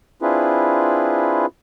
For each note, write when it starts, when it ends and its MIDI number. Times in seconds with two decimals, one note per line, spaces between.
0.22 1.46 60
0.22 1.46 62
0.22 1.46 64
0.22 1.46 65
0.22 1.46 68
0.22 1.46 71